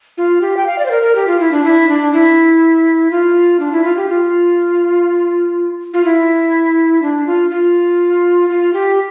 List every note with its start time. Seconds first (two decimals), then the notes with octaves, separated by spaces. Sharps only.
0.18 F4
0.41 G4
0.57 G5
0.66 F5
0.79 D5
0.86 C5
0.91 A#4
1.03 A#4
1.15 G4
1.27 F4
1.40 E4
1.52 D4
1.64 E4
1.89 D4
2.13 E4
3.11 F4
3.60 D4
3.72 E4
3.84 F4
3.97 G4
4.09 F4
5.94 F4
6.05 E4
7.02 D4
7.27 F4
7.51 F4
8.49 F4
8.73 G4